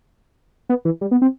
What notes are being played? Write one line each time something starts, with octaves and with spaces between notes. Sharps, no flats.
B3
E3
G3
B3
C4